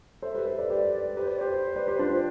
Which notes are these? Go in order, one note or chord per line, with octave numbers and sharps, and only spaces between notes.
A4 C5 E5
G4 B4
A4 C5
B4 D5
G4 B4 D5
G4 B4 C5
D5
G4 B4 C5
B4 D5
G4 B4
D4 F4